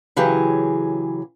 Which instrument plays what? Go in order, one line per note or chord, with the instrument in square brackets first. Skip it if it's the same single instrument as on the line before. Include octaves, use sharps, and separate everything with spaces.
[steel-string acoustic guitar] C#3 E3 F#3 G4 G#4